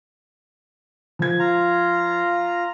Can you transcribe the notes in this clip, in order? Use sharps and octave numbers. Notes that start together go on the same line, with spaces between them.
F3 G#6
F4 A#5